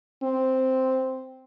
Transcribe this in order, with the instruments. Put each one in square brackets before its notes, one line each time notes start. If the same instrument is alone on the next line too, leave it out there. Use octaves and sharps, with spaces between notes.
[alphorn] C4